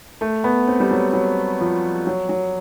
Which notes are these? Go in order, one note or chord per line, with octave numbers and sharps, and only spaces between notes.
A3
B3
C4
G3
F#3
F#3
F3
F#3
F#3